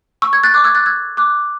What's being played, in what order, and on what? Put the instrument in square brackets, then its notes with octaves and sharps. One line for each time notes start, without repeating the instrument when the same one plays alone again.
[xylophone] C#6 E6
E6 G#6
F#6 A6
D6 F#6
E6 G#6
F#6 A6
E6 G#6
D6 F#6